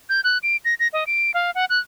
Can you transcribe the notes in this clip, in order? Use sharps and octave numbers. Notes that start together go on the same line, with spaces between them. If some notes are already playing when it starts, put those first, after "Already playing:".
G6
F#6
D7
A#6
A#6
D#5
D7
F5
F#5
F#6